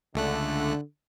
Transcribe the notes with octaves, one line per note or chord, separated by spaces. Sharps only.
C#2 D3 A3 F#6